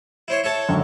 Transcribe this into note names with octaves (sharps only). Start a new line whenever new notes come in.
E4 C5 C#5
A4 C#5 E5
G#1 F#2 D3